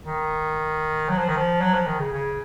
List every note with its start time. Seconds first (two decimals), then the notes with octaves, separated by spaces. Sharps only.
0.05 D#3
1.09 F#3
1.18 F3
1.28 D#3
1.37 F3
1.61 F#3
1.74 F3
1.86 D#3
1.99 C#3
2.13 C#3